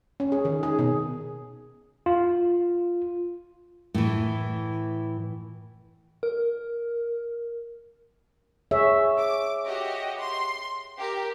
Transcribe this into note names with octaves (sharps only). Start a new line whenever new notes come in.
C#4
G#4
D#3
G#4
B2
F4
A2 E3
A#4
G#4 C#5 E5
D6
F#4 G4 D#5
C6
G4 A#4